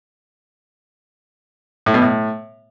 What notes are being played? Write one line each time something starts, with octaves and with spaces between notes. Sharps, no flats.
A2
B2
A2